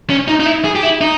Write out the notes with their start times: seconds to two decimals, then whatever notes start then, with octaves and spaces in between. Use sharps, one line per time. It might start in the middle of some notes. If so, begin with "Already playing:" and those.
0.10 C#4
0.28 D#4
0.40 D#4
0.46 E4
0.64 G#4
0.75 G4
0.83 E4
1.01 D#4